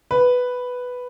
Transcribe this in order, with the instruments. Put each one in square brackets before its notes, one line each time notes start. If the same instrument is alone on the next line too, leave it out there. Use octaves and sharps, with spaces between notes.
[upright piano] B4